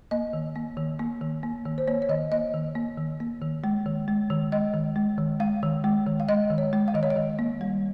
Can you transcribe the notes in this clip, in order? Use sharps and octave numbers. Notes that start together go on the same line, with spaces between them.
A#3 D#5
D#3
A#3
D#3
A#3
D#3
A#3
D#3
C5
A#3 C#5
C#5
D#3 D#5
A#3 D#5
D#3
A#3
D#3
A#3
D#3
G#3
D#3
G#3
D#3
G#3 D#5
D#3
G#3
D#3
G#3 F5
D#3
G#3
D#3
F5
G#3 D#5
D#3
C#5
G#3
F5
D#3 D#5
C#5
D#5
D#3
A#3
G3